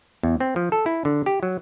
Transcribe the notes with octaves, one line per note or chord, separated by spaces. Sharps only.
E2
C4
F3
A4
E4
D3
G4
F#3